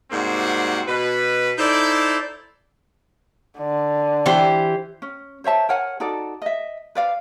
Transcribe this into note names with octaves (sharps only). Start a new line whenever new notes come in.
G#2 C3 G3 A#3 C4 F#4
B2 B4
D#4 E4 A4 C5 D5
D3
E3 G4 C5
C#4
C5 C#5 E5 A5
A#4 C#5 F#5 G#5
D#4 F#4 A4 D5
D#5 E5
B4 D5 F5